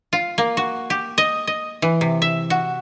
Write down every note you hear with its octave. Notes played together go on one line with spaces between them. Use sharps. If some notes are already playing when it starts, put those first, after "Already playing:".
F4
A#3
F#4
G4
D#5
D#5
E3
C3
E5
F#4